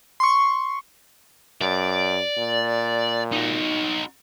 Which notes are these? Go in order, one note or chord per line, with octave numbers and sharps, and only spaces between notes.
C6 C#6
F#2 D5
A#2
D#4 F#4